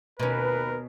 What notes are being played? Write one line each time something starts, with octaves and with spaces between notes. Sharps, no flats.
D#2 B2 C#4 A#4 B4